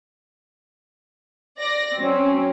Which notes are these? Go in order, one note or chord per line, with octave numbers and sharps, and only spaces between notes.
D5 A#6
F#3 C4 C#4